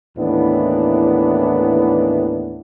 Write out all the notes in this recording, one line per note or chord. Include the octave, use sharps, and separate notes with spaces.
D#2 A2 E3 B3 D4